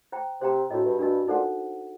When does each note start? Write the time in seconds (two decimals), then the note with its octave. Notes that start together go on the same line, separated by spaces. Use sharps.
0.12 C5 G5 A#5
0.41 C3 C5 G5 A#5
0.70 A2 D4 F#4 A#4 D#5
0.85 G2
0.99 G2 D4 F#4 A#4 D#5
1.28 A#2 D#4 A4 C5 F#5